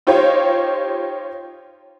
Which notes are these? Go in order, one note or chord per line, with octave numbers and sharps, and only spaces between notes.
D#4 F4 G4 C5 C#5